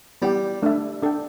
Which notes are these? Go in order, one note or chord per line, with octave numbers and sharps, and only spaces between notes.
G3 B3 E4 G4 D5 G5
A3 D4 A4 E5
D4 A4 G5